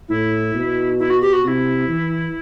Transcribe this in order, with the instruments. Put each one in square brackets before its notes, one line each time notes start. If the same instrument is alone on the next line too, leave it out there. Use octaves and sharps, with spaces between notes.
[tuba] A2 [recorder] E4
[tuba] B2
[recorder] E4
F#4
G4
F#4
[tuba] C3 [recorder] F#4
[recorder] E4
[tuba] E3